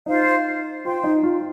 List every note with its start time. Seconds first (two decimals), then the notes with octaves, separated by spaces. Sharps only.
0.06 D#4 F4 C5 F5
0.85 F4 C5 G5 C6
1.04 D#4
1.23 F4